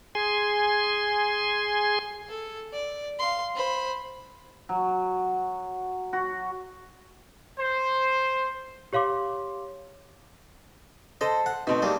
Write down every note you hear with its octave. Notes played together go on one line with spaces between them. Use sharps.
G#4 G#5 C6
A4
D5
F5 C6
C5 B5
F#3
F#4
C5
G4 C#5 F5 C6 D6
A4 C5 D#5
F#5
B2 A3 C4 D#4
G3 A#3 G#4